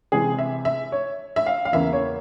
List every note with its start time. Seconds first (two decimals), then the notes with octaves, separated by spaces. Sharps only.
0.12 C3 E3 G#3 C4 G#4
0.39 E5
0.65 E5
0.92 C#5
1.36 E5
1.46 F5
1.65 F5
1.72 E2 C#3 E3 A#3 E5
1.93 C#5